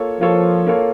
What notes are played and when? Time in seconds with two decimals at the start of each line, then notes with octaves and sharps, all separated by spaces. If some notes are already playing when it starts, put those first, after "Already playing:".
Already playing: A#3 F4 A4 C#5
0.21 F3 A#3 F4 A4 C#5
0.67 A#3 F4 A4 C#5